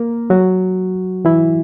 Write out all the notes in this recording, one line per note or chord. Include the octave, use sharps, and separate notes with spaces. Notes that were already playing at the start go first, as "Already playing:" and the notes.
Already playing: A#3 A#4
F#3 F#4
E3 E4